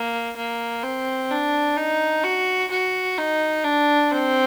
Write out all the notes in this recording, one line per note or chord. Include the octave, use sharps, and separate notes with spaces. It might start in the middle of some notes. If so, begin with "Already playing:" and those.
Already playing: A#3
A#3
C4
D4
D#4
F#4
F#4
D#4
D4
C4